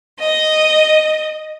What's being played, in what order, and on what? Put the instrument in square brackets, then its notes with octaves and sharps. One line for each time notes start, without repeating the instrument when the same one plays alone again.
[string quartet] D#5